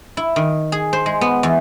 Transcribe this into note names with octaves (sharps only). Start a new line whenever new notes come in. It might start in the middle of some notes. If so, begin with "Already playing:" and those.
E4
D#3
G#4
C5
G#3
B3
E2